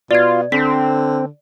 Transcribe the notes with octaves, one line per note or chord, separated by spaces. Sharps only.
B2 F4 D5 G#6
D3 C4 B6